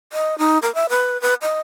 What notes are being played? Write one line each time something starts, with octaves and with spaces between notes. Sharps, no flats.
D#5
D#4
A#4
E5
B4
B4
D#5